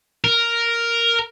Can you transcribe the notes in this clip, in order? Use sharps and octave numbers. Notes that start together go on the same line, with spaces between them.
A#4